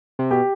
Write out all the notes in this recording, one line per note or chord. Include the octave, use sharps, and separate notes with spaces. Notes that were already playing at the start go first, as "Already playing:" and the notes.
C3
B2 G4